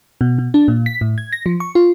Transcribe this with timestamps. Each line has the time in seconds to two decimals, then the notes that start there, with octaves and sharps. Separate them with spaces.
0.21 B2
0.38 B2
0.54 D4
0.68 A#2
0.86 B6
1.01 A2
1.18 G#6
1.33 A#6
1.46 F3
1.60 C#6
1.75 F4